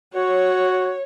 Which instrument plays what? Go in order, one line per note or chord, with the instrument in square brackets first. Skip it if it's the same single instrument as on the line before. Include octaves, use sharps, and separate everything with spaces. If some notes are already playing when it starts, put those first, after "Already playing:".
[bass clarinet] F#4 [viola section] C#5